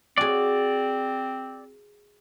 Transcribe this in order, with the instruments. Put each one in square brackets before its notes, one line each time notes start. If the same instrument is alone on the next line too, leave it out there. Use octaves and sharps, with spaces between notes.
[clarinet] C4 [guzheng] F#4 G#4 [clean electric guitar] D5